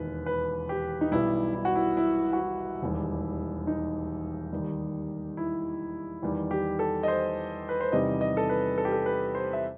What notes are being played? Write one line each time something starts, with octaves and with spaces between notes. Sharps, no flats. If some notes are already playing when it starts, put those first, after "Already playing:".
Already playing: E1 D#2 D#3 B4
B4
G4
D#4
B1 B2 G3 E4
E4
F#4
E4
E4
F#4
E4
E1 D#2 D#3 G3
D#4
D#2 D#3 G3
E4
E2 D#3 G3
G4
A4
D#5
C5
B4
C5
E2 C3 D#3 G3 D#5
D#5
A4
B4
A4
G4
A4
B4
C5
E5